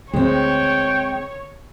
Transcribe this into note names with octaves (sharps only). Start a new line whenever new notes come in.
D2 G#3 C4 C#5 G5